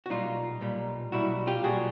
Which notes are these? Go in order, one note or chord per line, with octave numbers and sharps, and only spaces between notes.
F#4
B1 A#2 G3 D#4 F4
B1 A#2 G3
B1 A#2 G3 E4 F#4
F4 G4
B1 A#2 G3 F#4 G#4